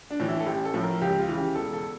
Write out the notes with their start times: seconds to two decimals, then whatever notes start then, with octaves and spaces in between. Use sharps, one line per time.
0.11 D4
0.20 A2 E3
0.28 E4
0.40 A4
0.46 A1 G4
0.65 A4
0.74 A2 F3
0.83 A#4
1.01 C#2 G4
1.20 F4
1.28 C#3 E3
1.37 G4
1.55 E1 A4
1.73 A4